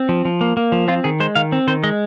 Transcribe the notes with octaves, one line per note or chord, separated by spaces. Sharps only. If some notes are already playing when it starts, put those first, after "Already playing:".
Already playing: C4
F3
F3
A#3
A#3
F3
C4 F4
D#3 G#4
G#3 C5
D#3 F5
C4
D#3 C5
G#3 D#5